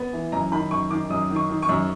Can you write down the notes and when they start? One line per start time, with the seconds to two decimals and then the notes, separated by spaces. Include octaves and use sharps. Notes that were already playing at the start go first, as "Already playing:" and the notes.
Already playing: B3
0.13 E3
0.32 F#2 A#5
0.52 D#3 B5
0.71 F#2 C#6
0.91 D#3 D6
1.10 F#2 D#6
1.30 D#3
1.36 C#6
1.49 D#3
1.62 C#6
1.69 F#2